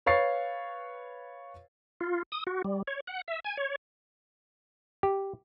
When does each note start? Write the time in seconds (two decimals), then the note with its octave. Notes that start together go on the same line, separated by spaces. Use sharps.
0.06 B4 C#5 F5 C#6 A6 C7
2.01 F4
2.32 D#6
2.47 F#4
2.65 G3
2.88 C#5
3.07 F#5
3.28 E5
3.45 G#5
3.57 C#5
5.03 G4